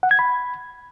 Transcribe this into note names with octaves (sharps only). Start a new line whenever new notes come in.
F#5
G#6
B5